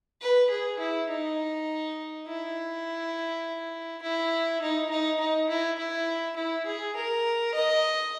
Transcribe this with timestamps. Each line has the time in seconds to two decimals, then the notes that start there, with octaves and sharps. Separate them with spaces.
0.21 B4
0.50 G#4
0.79 E4
1.09 D#4
2.27 E4
4.02 E4
4.61 D#4
4.90 D#4
5.20 D#4
5.49 E4
5.78 E4
6.36 E4
6.66 G#4
6.96 A#4
7.54 D#5